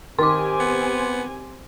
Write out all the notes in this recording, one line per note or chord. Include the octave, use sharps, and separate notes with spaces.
D#3 C4 G4 G#5 C6 D6
B3